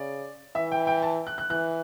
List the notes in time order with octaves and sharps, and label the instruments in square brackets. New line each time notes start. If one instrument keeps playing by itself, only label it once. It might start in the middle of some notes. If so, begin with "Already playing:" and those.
Already playing: [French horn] C#3 [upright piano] D5
[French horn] E3 [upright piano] E5
[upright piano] G5
G5
A5
F#6
F#6
[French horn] E3 [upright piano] F#6